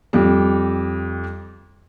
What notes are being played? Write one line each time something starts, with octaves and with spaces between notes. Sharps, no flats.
F2 G3